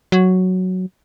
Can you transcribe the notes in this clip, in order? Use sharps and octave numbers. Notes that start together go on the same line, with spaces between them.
F#3